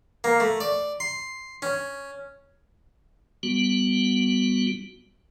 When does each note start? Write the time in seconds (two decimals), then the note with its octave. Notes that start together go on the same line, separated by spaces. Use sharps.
0.24 A#3
0.40 A3
0.60 D5
1.00 C6
1.62 C#4
3.43 G3 B3 F#4